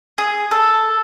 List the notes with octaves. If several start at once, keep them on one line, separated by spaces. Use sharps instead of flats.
G#4
A4